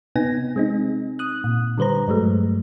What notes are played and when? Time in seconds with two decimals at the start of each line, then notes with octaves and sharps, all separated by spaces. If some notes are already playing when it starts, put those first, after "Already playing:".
0.16 C3 B3 D#4 G#5 A#6
0.56 G#3 C4 D#4
1.19 D#6 F#6
1.44 A#2
1.78 D3 G3 B4 C5 A#5
2.08 G2 F#3 G#3 A3